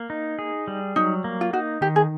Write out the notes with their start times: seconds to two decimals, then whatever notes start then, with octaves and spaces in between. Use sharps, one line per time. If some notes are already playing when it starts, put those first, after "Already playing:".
Already playing: A#3
0.10 D#4
0.39 G#4
0.68 G3
0.96 F#3 D#4
1.24 A#3
1.41 F4
1.53 D#4 F#4
1.81 D#3 G4
1.96 G#4